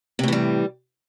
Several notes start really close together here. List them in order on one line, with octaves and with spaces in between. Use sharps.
C3 A2 E3 G3